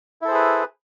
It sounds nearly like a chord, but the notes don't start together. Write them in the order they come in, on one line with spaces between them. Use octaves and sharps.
E4 A4 C5 G#4 B4